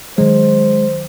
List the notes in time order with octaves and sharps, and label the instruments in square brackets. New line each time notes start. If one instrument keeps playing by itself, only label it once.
[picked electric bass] D#3 F#3 [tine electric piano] G#3 [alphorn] C5